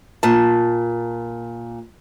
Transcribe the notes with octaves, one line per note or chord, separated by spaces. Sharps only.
A#2 A5